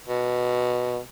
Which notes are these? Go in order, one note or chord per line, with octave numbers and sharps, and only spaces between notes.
B2